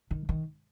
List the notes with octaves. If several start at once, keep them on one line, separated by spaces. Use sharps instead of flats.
D#3
D#3